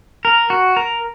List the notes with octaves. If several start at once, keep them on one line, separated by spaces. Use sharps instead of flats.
A#4
F#4
A#4